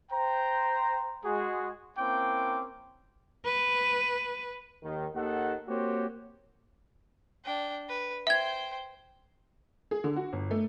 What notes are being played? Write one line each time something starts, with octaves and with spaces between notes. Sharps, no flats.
C5 G5 A#5
G#3 F#4 G#4
A#3 C4 C#4 E4 G5 D6
B4
D#2 D#3
D#2 D#3 A4 F#5
A#3 C4 F#4 G4 C#5
D4 G5
B4
C5 E5 G5 G#6
G#4
D3
F#4
G1
A3